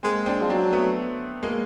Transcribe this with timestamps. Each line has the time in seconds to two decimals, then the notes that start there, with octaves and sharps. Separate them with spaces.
0.03 G#3 A#3 C4
0.26 C4 D4
0.42 F3
0.50 F#3 C4 D4
0.73 A3 B3
1.43 G#3 A#3